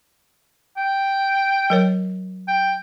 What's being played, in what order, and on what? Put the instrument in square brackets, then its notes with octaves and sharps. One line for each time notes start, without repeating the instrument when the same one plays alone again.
[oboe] G5
[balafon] F#3 A#4 C#5
[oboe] G5